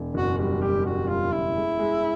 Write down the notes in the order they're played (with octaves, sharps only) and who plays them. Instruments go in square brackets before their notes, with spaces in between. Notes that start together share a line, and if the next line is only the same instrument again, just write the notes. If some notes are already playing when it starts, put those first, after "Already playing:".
Already playing: [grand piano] E1
[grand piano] F#1 [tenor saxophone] F#4
[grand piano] G3 [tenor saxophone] F#4
[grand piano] G3 [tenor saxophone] G4
[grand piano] G3 [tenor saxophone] F#4
[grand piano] G3 [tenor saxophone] F4
[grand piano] F#1 [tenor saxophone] E4
[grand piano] G#3
G#3